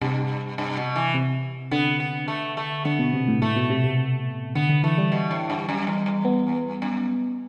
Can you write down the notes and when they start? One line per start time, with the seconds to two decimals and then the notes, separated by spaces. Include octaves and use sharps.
0.01 G2 C3
0.58 G2
0.77 B2
0.96 E3
1.14 C3
1.71 D3 B3
2.00 B3
2.28 A3
2.57 A3
2.85 D3 B3
2.99 B2
3.14 C3
3.28 A2
3.42 A2 A3
3.56 B2
3.70 C3
3.84 C3
4.55 D3 B3
4.69 D3
4.83 E3 A3
4.98 G3
5.12 B2
5.31 A2
5.50 G2
5.69 F#2
5.87 E2
6.06 E2
6.25 B3
6.82 F#2